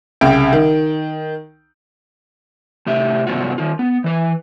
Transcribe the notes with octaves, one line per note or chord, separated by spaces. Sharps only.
C2 C#3 G5 D7
D#3
A2 C3 G4 E5
G2 C3 F#3 B3 F4 F#4
D#3 F4
B3
E3 B4